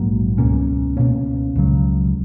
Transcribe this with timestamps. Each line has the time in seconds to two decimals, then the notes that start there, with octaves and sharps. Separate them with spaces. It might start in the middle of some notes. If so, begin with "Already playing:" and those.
Already playing: A#1 G#2 F#3 A#3
0.38 C#2 B2 A#3 C#4
0.97 C#2 B2 A#3 C#4
1.55 C#2 C#3 F#3